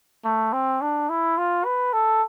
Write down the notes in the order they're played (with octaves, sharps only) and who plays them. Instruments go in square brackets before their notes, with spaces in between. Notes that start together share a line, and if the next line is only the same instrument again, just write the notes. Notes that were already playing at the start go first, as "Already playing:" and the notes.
[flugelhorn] A3
C4
D4
E4
F4
B4
A4